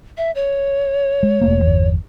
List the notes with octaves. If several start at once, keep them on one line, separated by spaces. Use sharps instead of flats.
E5
C#5
G#3
E1 A3 A#3
G1 E2